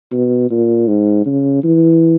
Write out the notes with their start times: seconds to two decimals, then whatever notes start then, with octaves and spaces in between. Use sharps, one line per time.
0.12 B2
0.51 A#2
0.88 G#2
1.26 C#3
1.64 E3